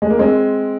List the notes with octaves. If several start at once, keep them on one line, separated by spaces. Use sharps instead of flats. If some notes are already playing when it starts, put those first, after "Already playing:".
G#3
A#3
G#3 C4